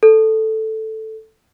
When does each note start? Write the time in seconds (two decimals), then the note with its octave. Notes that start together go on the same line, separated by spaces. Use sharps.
0.03 A4